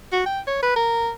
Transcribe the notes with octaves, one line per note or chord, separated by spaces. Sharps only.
F#4
G5
C#5
B4
A#4